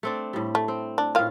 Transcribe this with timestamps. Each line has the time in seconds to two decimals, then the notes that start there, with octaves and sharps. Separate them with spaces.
0.03 A3 C4 D4
0.33 A2 G3
0.55 A3
0.68 C4
0.98 D4
1.15 A2 D#3 F4 F5